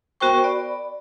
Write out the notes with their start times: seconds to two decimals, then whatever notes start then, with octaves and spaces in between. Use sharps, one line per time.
0.20 B3 F#4 A#4 C5 G5 C#6
0.44 D5 B5